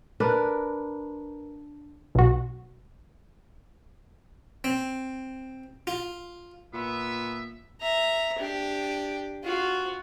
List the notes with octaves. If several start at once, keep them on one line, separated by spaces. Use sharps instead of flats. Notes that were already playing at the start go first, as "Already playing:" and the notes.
D4 A#4 B4
B1 F#4
C4
F4
A#2 B3 E5
E5 A#5
D4 G4
F4 F#4